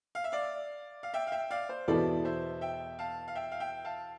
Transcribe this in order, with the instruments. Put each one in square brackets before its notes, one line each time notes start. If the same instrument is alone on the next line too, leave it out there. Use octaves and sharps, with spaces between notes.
[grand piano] F5
E5
D5 F5
F5
E5 G5
F5
E5 G5
D5 F5
C5
[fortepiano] E2 B2 B3 E4 A4 [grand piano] D5
[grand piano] C5 E5
E5 G5
F5 A5
F5
E5 G5
F5
E5 G5
F5 A5